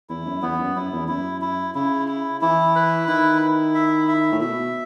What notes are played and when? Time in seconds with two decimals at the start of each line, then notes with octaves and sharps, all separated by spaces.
0.09 E2 E4
0.26 F#2
0.42 E2 B3
0.60 F#2
0.76 F#2 E4
0.93 E2
1.08 F#2 E4
1.41 E4
1.75 C#3 E4
2.08 E4
2.41 E3 E4
2.75 B4
3.08 D#3 E4
3.42 E4
3.75 E5
4.08 E5
4.32 A2
4.41 B2 E5